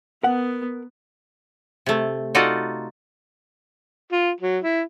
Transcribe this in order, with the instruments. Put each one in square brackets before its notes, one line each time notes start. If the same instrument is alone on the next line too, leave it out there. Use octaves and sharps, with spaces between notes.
[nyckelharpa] B3 [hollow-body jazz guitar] A#4 F#5
[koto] C3 A3
D#4 F4 F#4 A4 D5 D#5
[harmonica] F4
F#3
E4